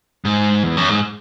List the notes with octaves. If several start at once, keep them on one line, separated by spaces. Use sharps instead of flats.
G#2
E2
F#2
G#2